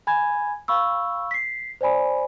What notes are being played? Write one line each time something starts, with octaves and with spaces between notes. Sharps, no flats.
G#5 B5 G#6
F5 B5 C#6 E6
B6 C7
C5 D5 G#5 B5